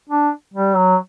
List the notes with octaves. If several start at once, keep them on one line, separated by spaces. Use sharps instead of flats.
D4
G3
F#3